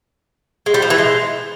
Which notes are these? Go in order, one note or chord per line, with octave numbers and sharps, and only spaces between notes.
G#3
G3
F3
E3
G#3